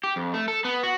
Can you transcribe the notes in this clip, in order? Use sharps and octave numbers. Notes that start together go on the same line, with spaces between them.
G4
F2
A3
A4
B3
F#4